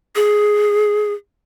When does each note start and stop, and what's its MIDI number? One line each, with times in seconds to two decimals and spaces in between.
0.16 1.13 68